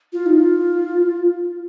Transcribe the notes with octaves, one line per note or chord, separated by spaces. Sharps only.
F4
D#4
F4